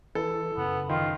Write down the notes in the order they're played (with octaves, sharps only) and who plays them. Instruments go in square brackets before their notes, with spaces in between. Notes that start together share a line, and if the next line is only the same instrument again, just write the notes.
[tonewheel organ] E3 E4 [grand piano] A4
[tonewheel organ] F#2 C#3 [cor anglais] B3
[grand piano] D#3 [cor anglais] F4